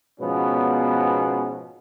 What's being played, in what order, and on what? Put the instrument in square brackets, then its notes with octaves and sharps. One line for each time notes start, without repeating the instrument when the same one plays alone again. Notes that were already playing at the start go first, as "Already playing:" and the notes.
[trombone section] G#2 B2 F3 B3 C#4